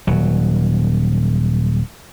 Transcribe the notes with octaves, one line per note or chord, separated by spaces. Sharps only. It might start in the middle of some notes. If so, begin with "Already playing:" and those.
D#1 F#3